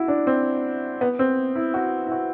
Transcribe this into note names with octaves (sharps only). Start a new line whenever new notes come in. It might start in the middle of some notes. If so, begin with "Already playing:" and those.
Already playing: E4 F#4
D4
C4
B3
C4
E4
F#4
E4
F#4